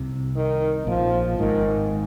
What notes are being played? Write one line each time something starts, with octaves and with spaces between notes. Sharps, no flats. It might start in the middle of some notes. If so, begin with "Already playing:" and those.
Already playing: C2 C3
D#3
A#1 A#2 F3
G#1 G#2 D#3